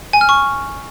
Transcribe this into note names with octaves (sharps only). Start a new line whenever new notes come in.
G#5
F6
C#6